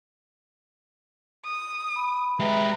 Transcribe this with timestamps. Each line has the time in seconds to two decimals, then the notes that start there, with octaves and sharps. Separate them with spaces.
1.44 D#6
1.96 B5
2.40 G#3 G4 B4 E5 A#5